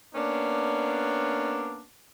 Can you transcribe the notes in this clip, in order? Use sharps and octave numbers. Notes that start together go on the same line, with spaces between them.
A#3 B3 C#4 D4